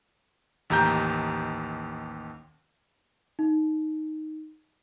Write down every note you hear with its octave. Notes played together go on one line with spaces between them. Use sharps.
A1 D#2 G4 A#5 G6
D#4